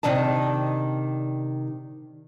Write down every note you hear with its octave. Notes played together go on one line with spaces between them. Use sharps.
C3 D#3 D4 D#5 A5